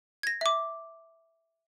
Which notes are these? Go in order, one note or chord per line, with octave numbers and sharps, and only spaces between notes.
G#6 A#6
E5 D6